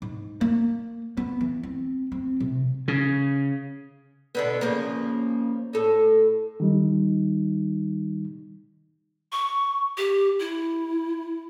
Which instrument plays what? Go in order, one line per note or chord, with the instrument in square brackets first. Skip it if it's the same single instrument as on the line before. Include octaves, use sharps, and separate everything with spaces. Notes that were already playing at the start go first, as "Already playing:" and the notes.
[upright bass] G#2
A#3
B3
E3
C4
C4
C3
[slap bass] C#3
[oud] B2 D3 B3
C#3 F3 A#3
A2 A4
[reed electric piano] D#3 G3 D#4
[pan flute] C#6
G4
E4